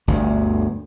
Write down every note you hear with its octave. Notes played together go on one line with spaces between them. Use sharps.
G1 D2 G2